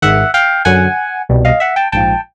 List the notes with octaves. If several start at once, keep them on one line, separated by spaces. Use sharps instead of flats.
G#1 G#2 D#3 E5 F#5
F5 G5
F#2 D3 F#3 F#5 G#5
C2 B2 G3
D#5 F5
E5 F#5
G5 A5
A#1 G#2 F3 G5 A5